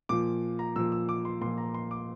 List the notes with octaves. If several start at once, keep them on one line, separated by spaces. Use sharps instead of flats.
A#2 F3 D6
A#5
A#2 F3 E6
E6
D6
C6
A#2 F3 C6
A#5
C6
D6